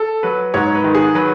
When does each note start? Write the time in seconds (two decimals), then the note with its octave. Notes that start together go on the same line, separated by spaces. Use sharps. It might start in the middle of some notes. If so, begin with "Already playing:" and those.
Already playing: A4
0.23 F#3 B4
0.54 G#2 C#5
0.75 B4
0.84 D#3
0.95 G#4
1.15 F#3 B4